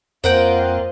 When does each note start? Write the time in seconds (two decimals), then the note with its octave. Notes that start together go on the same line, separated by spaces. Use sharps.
0.24 F2 A#3 F4 A#4 C5 D#5 F#5 G5